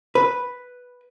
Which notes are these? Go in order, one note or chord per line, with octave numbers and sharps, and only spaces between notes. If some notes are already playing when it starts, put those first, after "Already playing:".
B4